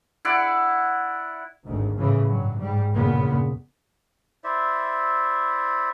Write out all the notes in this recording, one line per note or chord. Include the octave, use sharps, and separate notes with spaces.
E4 D5 F#5
G#1 D2 G#2
A2 C#3 E3
G2 F#3
G#2 G3
G1 E2 A#2 C#3 B3
E4 C5 D5 E5